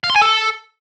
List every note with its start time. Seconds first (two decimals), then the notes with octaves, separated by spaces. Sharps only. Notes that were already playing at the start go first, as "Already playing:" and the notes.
0.04 F5
0.10 C6
0.16 G#5
0.22 A4